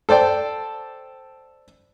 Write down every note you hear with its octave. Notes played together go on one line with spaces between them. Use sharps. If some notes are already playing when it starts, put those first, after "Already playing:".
A4 C5 D5 G5